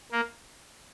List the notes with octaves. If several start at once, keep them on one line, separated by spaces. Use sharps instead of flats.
A#3